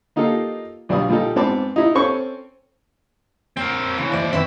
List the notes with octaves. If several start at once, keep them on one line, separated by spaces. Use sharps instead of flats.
A#3 D#4 F4 G4 A4
B1 G3 D4 F4 F5 D#6
A#2 G3 D#4 A4
G#2 B3 C4 A5 D6
D#4 E4
C4 C#4 A4 C5 C#6
C4 A#4 G5
C#3 E3 A#3
D#2 E3 C5 D5
D#3 B3 C4 E5